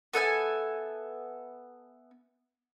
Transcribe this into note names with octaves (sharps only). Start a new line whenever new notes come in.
B3 A4 E5 G#5